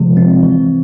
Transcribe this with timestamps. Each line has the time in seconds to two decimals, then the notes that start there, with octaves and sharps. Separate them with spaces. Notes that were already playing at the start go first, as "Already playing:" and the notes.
Already playing: C3 F3 G#3
0.17 C4
0.43 E3